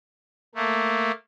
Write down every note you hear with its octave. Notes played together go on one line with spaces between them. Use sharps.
A3 A#3